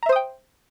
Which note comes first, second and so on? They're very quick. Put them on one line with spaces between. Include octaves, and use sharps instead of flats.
A#5 E5 C5 D#6 G5